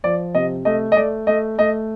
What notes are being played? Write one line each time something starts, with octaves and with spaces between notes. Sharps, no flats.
F3 D5
C3 D#5
A3 D#5
D#5
A3 D5
A3 D#5
A3 D#5